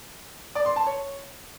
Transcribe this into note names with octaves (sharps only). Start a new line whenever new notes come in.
D5
C6
A5
C#5